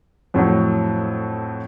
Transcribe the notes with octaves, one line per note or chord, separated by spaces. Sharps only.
F2 A2 F#3